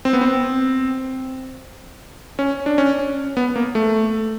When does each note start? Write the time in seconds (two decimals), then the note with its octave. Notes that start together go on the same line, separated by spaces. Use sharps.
0.05 C4
0.13 B3
0.21 C4
2.39 C#4
2.66 D4
2.78 C#4
3.37 B3
3.56 A#3
3.75 A3